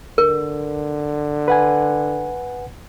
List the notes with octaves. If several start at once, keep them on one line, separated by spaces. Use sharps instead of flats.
D3 A#4
B4 F#5 G#5